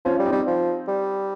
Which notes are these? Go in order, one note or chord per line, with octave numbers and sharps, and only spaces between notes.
F3 C#4 F4
G3
C4 D#4
G3
F3
G3